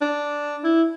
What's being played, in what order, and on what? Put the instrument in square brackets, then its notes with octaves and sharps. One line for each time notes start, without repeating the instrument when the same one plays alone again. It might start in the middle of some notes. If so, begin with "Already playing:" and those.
[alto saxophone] D4
E4